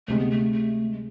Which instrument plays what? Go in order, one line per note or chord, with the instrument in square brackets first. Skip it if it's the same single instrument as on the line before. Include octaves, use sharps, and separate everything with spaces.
[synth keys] D2 C3 G#3 [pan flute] A3
[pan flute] B3
A3
A3
G#3